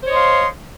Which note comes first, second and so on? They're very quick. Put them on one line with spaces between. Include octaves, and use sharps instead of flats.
C5 C#5 D#5 C6 F5